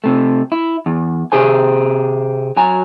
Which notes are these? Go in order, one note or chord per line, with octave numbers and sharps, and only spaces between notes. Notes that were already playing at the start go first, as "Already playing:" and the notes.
C3 A3
E4
E2
C3 G4 G#4 C5 G#5
F#3 F#4 G#5 A#5